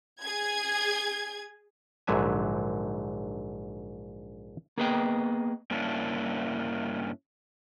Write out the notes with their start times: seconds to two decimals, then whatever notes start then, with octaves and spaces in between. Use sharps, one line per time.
0.22 G#4 G#6
2.07 A#1 G#2 D3 F#3 E5 G#5
4.78 A#3 B3 G#4 B4 D#5 G5
5.71 G2 A#3 C#4 D4 E4